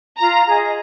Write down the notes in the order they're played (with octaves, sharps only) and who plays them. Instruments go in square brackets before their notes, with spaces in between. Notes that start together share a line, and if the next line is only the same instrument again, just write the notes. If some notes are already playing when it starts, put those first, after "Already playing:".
[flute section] F4 [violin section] A#5
[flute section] G#4 D#5